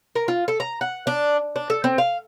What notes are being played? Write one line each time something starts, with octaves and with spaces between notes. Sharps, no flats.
A#4
F4
A4
A#5
F#5
D4
D4
A4
C4
F5